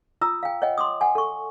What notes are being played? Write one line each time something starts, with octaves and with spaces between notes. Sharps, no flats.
F4 A#5 D#6 E6
F5 G5
C#5 D#5 F#5 G5
C6 D6 D#6
F#5 G#5
A4 C#6